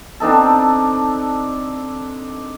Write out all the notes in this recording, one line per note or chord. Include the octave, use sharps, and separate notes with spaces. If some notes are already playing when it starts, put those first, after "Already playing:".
C4 D4 D#4 A4